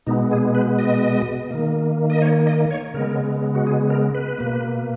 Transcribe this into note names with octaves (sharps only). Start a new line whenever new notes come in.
B2 G#3 B3 D#4
G#4
B4
D#5
D#3 A#3
D#5
C#5
D#5
C#5
C#3 G#3 B3 A#4
F#4
G#4
A#4
B4
B2 A#3